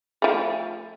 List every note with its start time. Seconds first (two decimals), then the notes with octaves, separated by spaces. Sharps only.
0.22 F3 A3